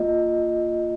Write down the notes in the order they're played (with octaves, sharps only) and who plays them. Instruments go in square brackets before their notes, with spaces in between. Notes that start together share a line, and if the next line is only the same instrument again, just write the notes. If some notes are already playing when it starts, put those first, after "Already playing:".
Already playing: [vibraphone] A#3 F4 D#5